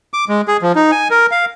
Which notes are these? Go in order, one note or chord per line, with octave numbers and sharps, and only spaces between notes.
D6
G#3
G#4
F3
D#4
G#5
A#4
F5